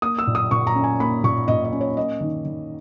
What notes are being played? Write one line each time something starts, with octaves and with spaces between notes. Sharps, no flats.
A#3 D#6
E6
A#2
D#6
A#2 C#6
A#5
C#4
G#5
A#3 B5
A#2 C#6
A#2 D#5
D#5
C#4
C#5
A#3 D#5
D#3
D#3